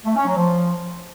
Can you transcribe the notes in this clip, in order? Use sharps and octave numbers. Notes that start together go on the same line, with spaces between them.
A3
C#4
F#3
F3